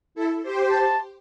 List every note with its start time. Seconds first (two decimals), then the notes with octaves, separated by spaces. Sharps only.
0.15 E4 A4
0.43 G4 C5
0.71 A5